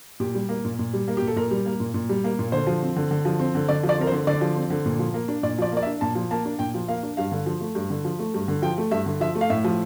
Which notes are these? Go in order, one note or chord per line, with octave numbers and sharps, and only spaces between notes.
A#2 G4
G3
A#3
A#2
A#2
G3
A#3
G4
A#2
A4
A#2 A#4
G3
A#3
A#2
A#2
G3
A#3
A#2
D3 C5
F3
C4
D3
D3
F3
C4
D3
D3 D5
F3
D5
C4 A#4
C5
D3
D3 D5
F3
C4
D3
A#2
F3
A#3
D4
A#2 D5
F3 D5
A#3 D5
E5
D4
A#2 A5
F3
A#3 A5
D4
A#2 G5
F3
A#3 F5
D4
G2 F5
D3
F3
A3
G2
D3
F3
A3
G2
D3
F3 G5
A3
G2 E5
D3
F3 E5
A3
F5
A2 E5
F3